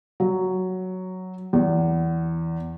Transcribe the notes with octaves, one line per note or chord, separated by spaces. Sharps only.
F#3
E2